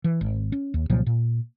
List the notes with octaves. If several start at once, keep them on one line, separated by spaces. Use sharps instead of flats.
E3
G#1
C#4
D#2
C2 A#2 F3 F#3
A#2